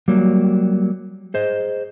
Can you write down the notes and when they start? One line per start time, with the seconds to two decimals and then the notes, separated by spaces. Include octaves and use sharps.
0.08 F#3 G3 A#3
1.34 G#4 C5 D#5